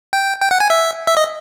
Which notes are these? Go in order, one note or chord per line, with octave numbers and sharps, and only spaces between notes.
G5
G5
F#5
G#5
E5
E5
D#5